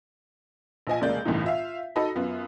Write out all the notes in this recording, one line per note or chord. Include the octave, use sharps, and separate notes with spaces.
A#1 F3 D#5 G#5
F1 C#3 G#3 A#3 D5 G6
G1 C2 A2 C#3 E3 D#4
F4 E5 F5
D#4 F#4 A4 D#5 B5
F#2 B3 F4